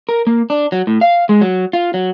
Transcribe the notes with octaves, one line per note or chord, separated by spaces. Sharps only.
A#4
A#3
D4
F#3
A2
F5
G#3
F#3
F4
F#3